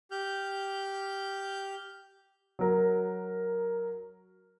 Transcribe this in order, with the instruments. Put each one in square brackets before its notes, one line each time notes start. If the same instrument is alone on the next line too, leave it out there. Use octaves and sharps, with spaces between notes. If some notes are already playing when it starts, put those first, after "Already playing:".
[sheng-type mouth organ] G4 F6 G6
[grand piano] F#3 A#4